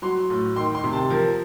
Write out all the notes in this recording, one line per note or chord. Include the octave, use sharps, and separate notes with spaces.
F#3 C6
A2
D#3 C6
C6
C3
A5
F3 A#4